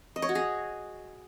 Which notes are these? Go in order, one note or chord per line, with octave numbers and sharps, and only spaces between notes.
D#5
C#5
F#4
G#4